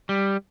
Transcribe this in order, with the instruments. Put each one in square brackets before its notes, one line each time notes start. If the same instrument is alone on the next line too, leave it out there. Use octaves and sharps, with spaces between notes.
[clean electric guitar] G3